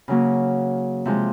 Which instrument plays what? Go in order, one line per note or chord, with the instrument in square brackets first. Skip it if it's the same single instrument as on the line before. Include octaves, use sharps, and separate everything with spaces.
[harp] C#3 F#3 A#3 C#4
C3 F3 G#3